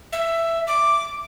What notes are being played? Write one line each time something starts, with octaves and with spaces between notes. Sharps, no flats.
E5
D6